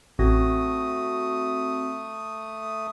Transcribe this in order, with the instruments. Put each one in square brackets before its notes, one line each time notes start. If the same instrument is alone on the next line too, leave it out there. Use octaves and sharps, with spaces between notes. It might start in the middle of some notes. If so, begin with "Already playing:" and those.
[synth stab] A1 [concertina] A3 D#6 [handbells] C4 F#4 A#6